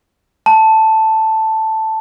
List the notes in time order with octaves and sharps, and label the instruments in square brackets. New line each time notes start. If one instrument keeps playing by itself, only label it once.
[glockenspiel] A5